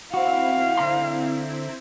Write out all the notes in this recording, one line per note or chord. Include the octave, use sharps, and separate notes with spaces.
C4 E4 F#4 F5
D3 A#5 C6